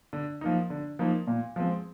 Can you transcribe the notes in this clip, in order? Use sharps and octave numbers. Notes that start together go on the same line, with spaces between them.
D3
F3 A#3 D#4
D3
F3 A#3 D#4
A#2
F3 G#3 C4